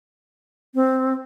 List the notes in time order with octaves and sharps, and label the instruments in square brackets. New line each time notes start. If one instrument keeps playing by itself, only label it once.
[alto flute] C4